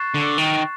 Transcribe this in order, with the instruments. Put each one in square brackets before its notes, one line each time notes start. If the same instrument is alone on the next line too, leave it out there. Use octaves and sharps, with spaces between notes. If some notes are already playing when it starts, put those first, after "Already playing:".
Already playing: [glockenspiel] C#6 F#6 A6 C7 E7
[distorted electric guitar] D3
D#3